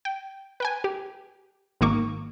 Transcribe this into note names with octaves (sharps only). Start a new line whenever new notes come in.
G5
B4 G5 G#5
G4
G#1 D#3 A#3 C#6 D6